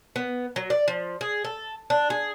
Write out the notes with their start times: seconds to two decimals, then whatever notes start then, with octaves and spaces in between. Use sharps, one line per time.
0.16 B3
0.56 F#3
0.70 D5
0.88 F3
1.21 G#4
1.45 A4
1.90 D4
2.10 G#4